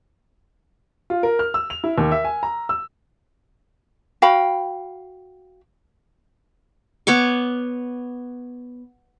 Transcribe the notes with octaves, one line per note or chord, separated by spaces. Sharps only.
F4
A#4
F6
E6
F7
E4
D#2
E5
G#5
A#5
E6
F#4 F5 G5 B5
B3 C#5 C#6 D6